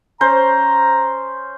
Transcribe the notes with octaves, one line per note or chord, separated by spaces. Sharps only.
C#4 C5 A#5